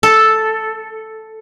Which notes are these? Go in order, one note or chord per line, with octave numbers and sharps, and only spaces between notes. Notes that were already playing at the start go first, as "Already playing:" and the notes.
A4